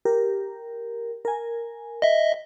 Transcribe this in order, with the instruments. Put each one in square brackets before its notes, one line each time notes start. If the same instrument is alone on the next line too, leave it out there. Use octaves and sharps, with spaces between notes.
[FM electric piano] G4 A#4
A#4 G#5
[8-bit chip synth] D#5 E5